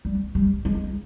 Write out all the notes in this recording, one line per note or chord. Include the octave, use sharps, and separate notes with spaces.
G3
G3
G#3